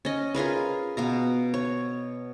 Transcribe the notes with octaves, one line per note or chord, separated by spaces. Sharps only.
C#4 D#5
F4 G#4 A#4 B4
B2 F5 A#5
C#5